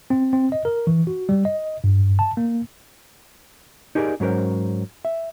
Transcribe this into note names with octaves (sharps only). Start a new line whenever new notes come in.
C4
C4
D#5
A#4
E3
F#4
G3
D#5
G2
A5
A#3
D#4 G4 G#4 A#4 C5 D5
G#2 F#3 C#4 A#4 C5
E5